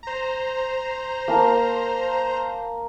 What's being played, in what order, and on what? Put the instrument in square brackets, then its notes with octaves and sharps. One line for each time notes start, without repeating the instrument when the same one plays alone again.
[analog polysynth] C5 A#5
[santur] A#3 A5 E6